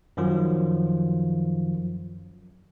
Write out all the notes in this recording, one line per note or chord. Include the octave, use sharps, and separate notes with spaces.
F#2 D#3 F3 F#3 F4